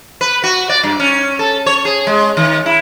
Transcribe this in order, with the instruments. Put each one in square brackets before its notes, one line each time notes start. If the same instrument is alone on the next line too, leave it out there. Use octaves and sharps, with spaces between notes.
[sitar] B4
F#4
D5
G2
C#4
A4
C#5
G#4
G#3
D#3
E4